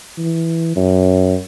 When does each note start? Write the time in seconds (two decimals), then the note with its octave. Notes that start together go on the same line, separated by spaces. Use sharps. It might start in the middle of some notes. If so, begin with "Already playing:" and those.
0.17 E3
0.76 F#2